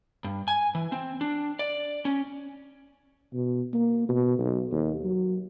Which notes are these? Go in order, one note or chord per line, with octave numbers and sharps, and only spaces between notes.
G2
G#5
E3
C4
D4
D5
C#4
B2
A#3
B2
B1
D#2
F#3